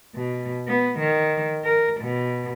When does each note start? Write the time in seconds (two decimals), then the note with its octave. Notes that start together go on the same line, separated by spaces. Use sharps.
0.15 B2
0.68 B3
0.99 D#3
1.64 A#4
2.01 B2